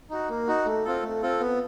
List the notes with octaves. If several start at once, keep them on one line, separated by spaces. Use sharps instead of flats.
D#4 F#4
A#3
D#4 F#4
A3
C4 F4 A4
A3
C4 F4 A4
B3